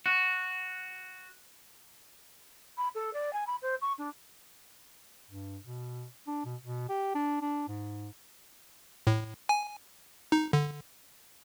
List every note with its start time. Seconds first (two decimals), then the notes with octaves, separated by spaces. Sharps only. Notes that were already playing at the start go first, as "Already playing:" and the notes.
0.06 F#4
2.77 B5
2.94 A4
3.13 D5
3.33 G#5
3.47 B5
3.62 C5
3.81 C#6
3.98 D4
5.29 G2
5.65 B2
6.27 D4
6.45 B2
6.62 B2
6.89 G4
7.15 D4
7.42 D4
7.69 G#2
9.07 A2
9.49 G#5
10.32 D#4
10.53 D3